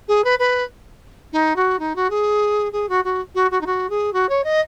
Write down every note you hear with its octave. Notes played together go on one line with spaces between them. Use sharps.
G#4
B4
B4
D#4
F#4
D#4
F#4
G#4
G#4
F#4
F#4
F#4
F#4
D#4
F#4
G#4
F#4
C#5
D#5